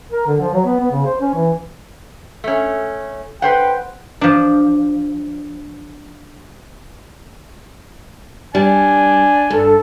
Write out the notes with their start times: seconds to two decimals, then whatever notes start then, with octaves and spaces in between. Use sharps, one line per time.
0.12 A#4
0.27 D3
0.40 F3
0.53 F#3
0.65 B3
0.80 B3
0.91 C#3
1.05 C5
1.21 C#4
1.34 E3
2.44 A3 C#4
3.42 B4 C5 F#5 G5
4.21 F3 D4
8.55 G3 D4 G#5
9.50 G2 A4